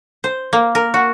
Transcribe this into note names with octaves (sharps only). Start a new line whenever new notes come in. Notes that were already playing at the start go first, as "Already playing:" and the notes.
C5
A#3
A#4
F#4